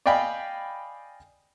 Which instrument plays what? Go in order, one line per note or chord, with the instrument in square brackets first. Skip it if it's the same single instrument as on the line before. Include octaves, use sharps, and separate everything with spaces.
[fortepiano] D5 D#5 F5 G5 G#5 B5